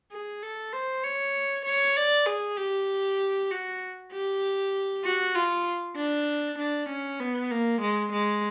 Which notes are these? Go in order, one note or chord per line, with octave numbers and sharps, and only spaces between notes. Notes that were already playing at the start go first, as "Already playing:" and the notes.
G#4
A4
C5
C#5
C#5
D5
G#4
G4
F#4
G4
F#4
F4
D4
D4
C#4
B3
A#3
G#3
G#3